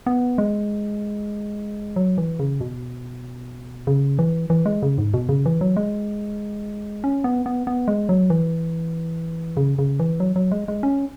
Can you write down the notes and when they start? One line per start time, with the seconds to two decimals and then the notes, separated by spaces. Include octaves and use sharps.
0.06 B3
0.38 G#3
1.96 F#3
2.18 E3
2.39 C#3
2.61 B2
3.87 C#3
4.19 E3
4.50 E3
4.66 G#3
4.83 C#3
4.98 G#2
5.14 B2
5.29 C#3
5.46 E3
5.61 F#3
5.77 G#3
7.04 C#4
7.24 B3
7.46 B3
7.67 B3
7.88 G#3
8.09 F#3
8.30 E3
9.57 C#3
9.79 C#3
10.00 E3
10.20 F#3
10.36 F#3
10.52 G#3
10.68 G#3
10.83 C#4